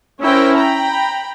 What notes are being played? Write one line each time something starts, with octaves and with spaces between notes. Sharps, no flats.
C#4 E4 A#4 C5 G5
G5 A#5 B5